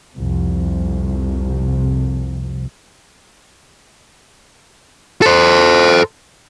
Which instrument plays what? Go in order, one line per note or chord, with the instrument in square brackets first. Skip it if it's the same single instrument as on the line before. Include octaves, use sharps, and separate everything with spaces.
[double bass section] C2 F2 C3
[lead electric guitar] A4 C5